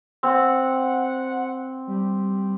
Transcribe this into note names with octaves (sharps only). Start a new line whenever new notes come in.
C4 F#5
G3